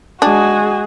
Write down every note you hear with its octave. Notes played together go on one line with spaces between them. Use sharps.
G#3 D4 F#4 G#4